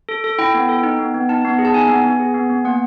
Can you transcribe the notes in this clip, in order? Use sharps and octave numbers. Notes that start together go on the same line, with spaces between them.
A4
A4
E4 G5
B3
A4
D#4
B3
B3
D#4 A5
B3
G#4
A5
D#4 G#5
B3
B3
G#4
B3
B3
A#3 F#5